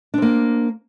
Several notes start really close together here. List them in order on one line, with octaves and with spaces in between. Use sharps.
D4 C4 A#3